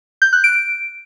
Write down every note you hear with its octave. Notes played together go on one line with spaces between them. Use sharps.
G6
F#6
D7